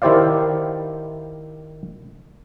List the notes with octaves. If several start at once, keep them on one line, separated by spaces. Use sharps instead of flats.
D#3 E4 G4 C5 D5 F5